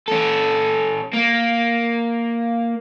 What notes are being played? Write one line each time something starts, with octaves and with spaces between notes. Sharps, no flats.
C#4 A4
A#3